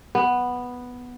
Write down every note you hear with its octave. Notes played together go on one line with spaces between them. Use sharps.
B3